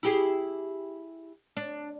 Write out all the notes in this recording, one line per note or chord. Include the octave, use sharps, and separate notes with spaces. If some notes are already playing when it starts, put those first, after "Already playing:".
E4 G4 G#4
D4